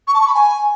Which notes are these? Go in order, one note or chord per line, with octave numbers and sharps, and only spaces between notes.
C#6
A5
C#6
B5
G#5